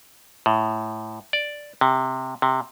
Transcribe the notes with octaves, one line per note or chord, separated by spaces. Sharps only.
A2
D5
C3
C3